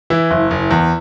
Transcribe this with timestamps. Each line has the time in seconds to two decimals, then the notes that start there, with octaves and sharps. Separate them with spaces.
0.10 E3 E4
0.31 F#1
0.51 F#1
0.71 E2